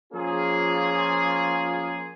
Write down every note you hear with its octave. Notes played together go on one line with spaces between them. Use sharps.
F3 A#3 C#4 F4 G#4